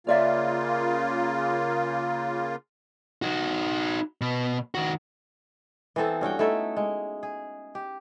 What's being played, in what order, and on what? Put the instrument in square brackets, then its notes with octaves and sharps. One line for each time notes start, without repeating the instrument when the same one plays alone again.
[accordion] C#3 A#3 F4 [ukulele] C#5 D5 E5
[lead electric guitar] D#4 F#4
B2
D#3 F#4
[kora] E3 B3 C4 A4
G2 C#4 F#4 G5
A3 D#4 E4 A4
G#3
G#4
G4